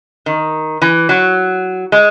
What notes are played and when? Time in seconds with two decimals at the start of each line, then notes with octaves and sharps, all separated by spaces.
0.26 D#3
0.82 E3
1.09 F#3
1.92 G#3